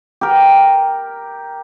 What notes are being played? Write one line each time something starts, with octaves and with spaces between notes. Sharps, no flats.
G4 A#4